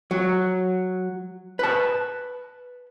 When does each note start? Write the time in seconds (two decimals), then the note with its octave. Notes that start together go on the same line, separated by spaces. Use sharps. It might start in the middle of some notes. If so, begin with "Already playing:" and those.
0.11 F#3
1.59 B4 A5